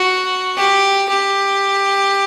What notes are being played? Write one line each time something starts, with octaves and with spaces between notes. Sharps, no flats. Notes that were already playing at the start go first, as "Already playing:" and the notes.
Already playing: F#4
G4
G4